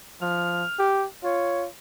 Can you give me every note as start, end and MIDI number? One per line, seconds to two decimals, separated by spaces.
0.22 0.64 53
0.22 0.85 89
0.79 1.06 67
1.23 1.68 65
1.23 1.64 73